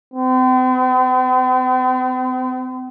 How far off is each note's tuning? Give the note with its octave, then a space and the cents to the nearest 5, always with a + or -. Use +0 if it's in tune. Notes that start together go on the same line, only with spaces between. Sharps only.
C4 -45